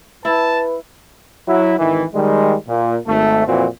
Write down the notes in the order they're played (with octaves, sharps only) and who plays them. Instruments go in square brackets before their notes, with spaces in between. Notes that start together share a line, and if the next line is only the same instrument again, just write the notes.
[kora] E4 [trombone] B4 [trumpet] A5
[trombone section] F#3 E4
G#1 D#3 E3
D#3 G3 G#3
A#2
G#1 A3
F2 A#2 E3 C4 F#4